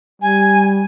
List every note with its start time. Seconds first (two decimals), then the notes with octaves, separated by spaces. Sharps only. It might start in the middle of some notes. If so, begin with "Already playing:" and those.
0.22 G3 G#5